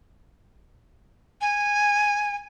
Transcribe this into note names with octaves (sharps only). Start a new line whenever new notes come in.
G#5